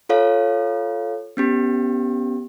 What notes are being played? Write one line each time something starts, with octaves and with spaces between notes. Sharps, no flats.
F4 A4 C#5 F5
B3 C#4 G4